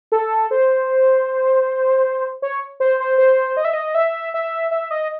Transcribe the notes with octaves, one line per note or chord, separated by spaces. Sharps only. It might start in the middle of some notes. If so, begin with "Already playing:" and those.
A4
C5
C#5
C5
C5
C5
D#5
E5
D#5
E5
E5
E5
D#5